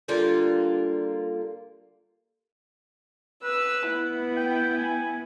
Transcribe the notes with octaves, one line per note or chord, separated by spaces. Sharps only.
D3 G3 A#3 F4
B4 E6
B3 E4
G5
G#5